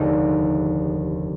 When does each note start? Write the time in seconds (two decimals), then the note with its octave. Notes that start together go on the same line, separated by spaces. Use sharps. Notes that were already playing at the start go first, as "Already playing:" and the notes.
Already playing: F1 D#2 D3 G#3 D#4